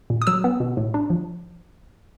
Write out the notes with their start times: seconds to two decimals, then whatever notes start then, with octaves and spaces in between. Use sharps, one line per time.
0.10 A#2
0.22 D#6
0.27 F#3 E6
0.44 B3
0.60 B2
0.77 A2
0.94 D4
1.10 F3